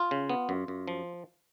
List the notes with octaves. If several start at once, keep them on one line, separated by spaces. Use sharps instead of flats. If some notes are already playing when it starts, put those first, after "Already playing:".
Already playing: F4
C#3
B3
F#2
F#2
F3